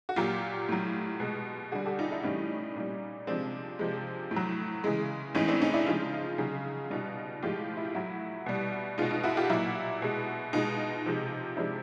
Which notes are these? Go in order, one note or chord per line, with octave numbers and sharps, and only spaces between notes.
F#4
A#2 F#3 F4 G4
A2 F#3
B2 G#3
D3 G3 F#4 G#4
G4 A4
D#4 F4
D4 E4
A2 E3 G3 C#4 D#4
A#2 G3
C3 F3 G#3 C4 D4
C3 F3 G#3
A2
F#3
C#3 E3 G#3
A2 E3 G#3 C#4 D#4
C4 D4
C#4 D#4
D4 E4
C#3 F3 G#3 D#4 F4
C#3 F#3
B2 G3 D#4 F4
A2 F3 G#3 F4 G4
E4
F4
A2 F#3 E4 F#4
B2 G3
B2 G#3 D#4 F4
D#4 F4
E4 F#4
F4 G4
A#2 F#3 E4 F#4
B2 G#3
B2 G#3 D#4 F4
C3 F3 G#3
C3 F3 G#3 D4 E4